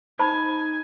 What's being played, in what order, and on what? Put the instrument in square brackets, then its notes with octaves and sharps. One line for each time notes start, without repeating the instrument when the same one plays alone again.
[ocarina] D#4 [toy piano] C5 A5 B5 [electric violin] G#5